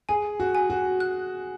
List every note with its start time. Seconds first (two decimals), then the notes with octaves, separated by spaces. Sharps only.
0.09 G#4 G#5
0.40 F#4
0.55 G#5
0.70 F#4
1.00 F#6